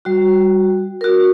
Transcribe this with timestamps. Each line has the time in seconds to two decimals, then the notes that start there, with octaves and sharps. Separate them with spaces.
0.05 G3 F#4
1.01 F#4 A#4